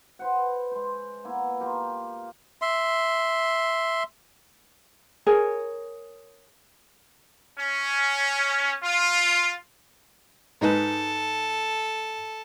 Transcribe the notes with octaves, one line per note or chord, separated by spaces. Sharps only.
B4 C5 F#5
G#3 C5
A#3 B3 E4
F4 G4 A#4
E5 C6
G#4 A#4 C#5 G#5
C#4
F4
G#2 D#4 A4 B4